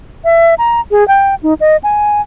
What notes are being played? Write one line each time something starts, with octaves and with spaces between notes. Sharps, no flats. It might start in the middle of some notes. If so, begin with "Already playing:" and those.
E5
A#5
G#4
G5
D#4
D#5
G#5